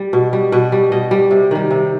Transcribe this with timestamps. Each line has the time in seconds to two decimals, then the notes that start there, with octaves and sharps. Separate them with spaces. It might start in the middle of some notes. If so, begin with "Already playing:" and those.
Already playing: G3
0.13 B2
0.33 G3
0.52 B2 B4
0.72 G3
0.92 B2 D#5
1.11 G3
1.31 C3
1.51 D#3 G3
1.71 C3